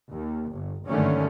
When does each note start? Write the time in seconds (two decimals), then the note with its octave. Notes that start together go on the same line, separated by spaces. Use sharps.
0.12 D#2
0.51 G1
0.86 F#1 G2 D3 D#3 A3 C#4